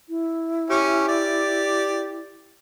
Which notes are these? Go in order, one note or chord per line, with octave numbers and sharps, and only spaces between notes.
E4
C#4 G4
D5